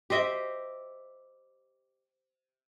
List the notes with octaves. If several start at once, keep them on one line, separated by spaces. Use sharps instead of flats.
G4 C5 D#5 E5